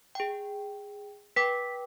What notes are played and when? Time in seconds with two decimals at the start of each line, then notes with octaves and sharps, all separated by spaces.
0.15 G#4 G5
1.36 B4 G5 D6 B6